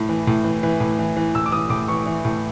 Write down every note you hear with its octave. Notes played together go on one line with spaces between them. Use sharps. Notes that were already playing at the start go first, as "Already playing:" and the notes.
Already playing: A2
E3
A2
E3
E3
A2
E3
E3
A2 E6
D6
E3 D#6
A2 D6
E3 C#6
E3
A2